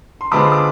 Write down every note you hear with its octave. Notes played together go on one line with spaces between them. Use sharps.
C6
D3 G#3 B3 F4 C5 B5 D6
D6